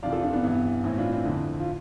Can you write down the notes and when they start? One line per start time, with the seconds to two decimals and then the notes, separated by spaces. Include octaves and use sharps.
0.03 F2 C3 E3 D5 F5
0.12 F4 A4
0.23 D4 F4
0.33 B3 D4
0.43 G2 E3 B3
0.84 A2 E3 C4
0.98 D4 F4
1.12 C4 E4
1.25 F2 D3
1.60 F4